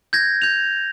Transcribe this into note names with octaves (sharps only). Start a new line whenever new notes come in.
G6 G#6 A#6
G6 F7